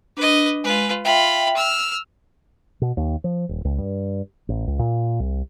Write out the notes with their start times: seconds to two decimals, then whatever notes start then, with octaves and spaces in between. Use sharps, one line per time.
0.17 D4 B4 D#5
0.64 G#3 F4 B4
1.05 F4 E5 G5 B5
1.56 E6 F6
2.82 B2
2.97 D#2
3.24 F3
3.49 D#1
3.65 C#2
3.78 G2
4.49 A1
4.67 C#2
4.79 A#2
5.20 C2